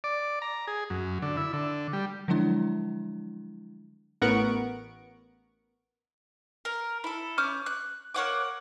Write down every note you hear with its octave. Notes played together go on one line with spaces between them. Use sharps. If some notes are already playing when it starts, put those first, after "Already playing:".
D5
A#5
G#4
F#2
D3
E4
D3
G3
D3 F3 F#3 G#3 D4 E4
A1 B3 A#4 F#5 C#6 D7
A#4
E4 A4
C#4 D6 F6 G6
F#6
A#3 C#5 F#5 D6